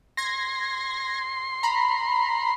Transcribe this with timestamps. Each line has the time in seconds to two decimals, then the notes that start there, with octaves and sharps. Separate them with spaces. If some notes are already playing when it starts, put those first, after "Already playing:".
0.17 C6 G#6 A#6
1.63 A#5 B5